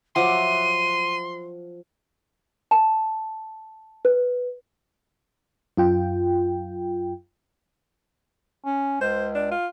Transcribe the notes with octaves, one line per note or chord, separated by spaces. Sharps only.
F3 F#3 E5 F#5 C6 D6 D#7
A5
B4
F#2 F4 G5
C#4
C#2 C5
D4
F4